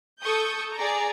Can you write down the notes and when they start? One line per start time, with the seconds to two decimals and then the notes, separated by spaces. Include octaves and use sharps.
0.21 A4 C#6 D#6 G6
0.76 G#4 D5 A#5